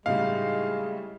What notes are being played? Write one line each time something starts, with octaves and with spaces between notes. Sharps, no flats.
A2 C#3 G3 G#3 D#4 F5